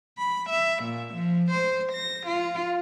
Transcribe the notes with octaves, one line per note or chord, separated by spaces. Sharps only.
B5
E5
A#2
F3
C5
A#6
F4